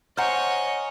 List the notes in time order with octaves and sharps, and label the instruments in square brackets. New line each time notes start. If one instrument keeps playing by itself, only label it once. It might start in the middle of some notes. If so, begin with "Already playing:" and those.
[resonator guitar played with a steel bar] C5 F#5 [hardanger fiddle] C#5 D#5 [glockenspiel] G#5 A#5 F6